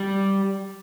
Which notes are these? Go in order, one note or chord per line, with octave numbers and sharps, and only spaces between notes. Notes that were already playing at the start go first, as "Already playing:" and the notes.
Already playing: G3